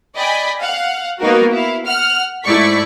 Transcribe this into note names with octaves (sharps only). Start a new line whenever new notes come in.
D5 D#5 G5 G#5 B5
F5 F#5
A#3 B3 D#4 F#4 A#4
E4 F5
F#5 F6
G#2 A3 E4 D5 C#6 B6